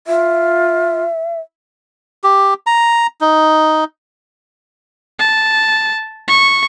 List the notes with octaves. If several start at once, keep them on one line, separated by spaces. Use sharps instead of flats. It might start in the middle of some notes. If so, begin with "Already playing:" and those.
F4 E5
G4
A#5
D#4
A5
C#6